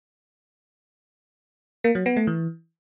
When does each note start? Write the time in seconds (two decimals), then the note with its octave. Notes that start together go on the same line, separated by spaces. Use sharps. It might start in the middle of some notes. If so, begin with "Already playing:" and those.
1.84 A#3
1.95 F#3
2.06 B3
2.17 A3
2.27 E3